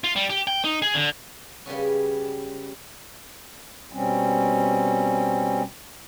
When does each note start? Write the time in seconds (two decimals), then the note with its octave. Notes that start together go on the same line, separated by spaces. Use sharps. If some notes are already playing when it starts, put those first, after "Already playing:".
0.04 F4
0.16 G3
0.30 G4
0.47 G5
0.64 D#4
0.82 G#4
0.95 D3
1.66 C#3 G3 B3 C#4
3.93 B2 G3 C4 C#4